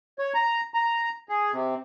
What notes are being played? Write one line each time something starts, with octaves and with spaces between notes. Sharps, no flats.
C#5
A#5
A#5
G#4
C3